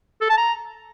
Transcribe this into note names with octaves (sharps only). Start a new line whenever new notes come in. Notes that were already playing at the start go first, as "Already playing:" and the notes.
A4
A5
A#5